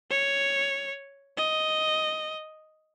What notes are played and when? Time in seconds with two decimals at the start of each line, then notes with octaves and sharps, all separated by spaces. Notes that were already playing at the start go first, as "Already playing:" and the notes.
0.11 C#5
1.37 D#5